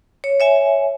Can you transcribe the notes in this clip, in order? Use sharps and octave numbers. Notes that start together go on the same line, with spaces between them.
C#5
C#5 E5 G#5